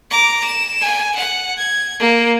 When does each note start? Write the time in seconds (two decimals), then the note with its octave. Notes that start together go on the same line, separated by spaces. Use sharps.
0.11 A#5 D6
0.45 E7
0.81 G#5
1.16 F#5
1.58 G#6
2.00 A#3